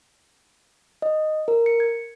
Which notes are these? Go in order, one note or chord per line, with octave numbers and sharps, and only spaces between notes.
D#5
A#4
C#7
G#6